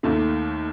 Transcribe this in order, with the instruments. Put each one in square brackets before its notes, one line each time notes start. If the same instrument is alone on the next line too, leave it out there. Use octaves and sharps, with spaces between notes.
[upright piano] D#2 D#3 A3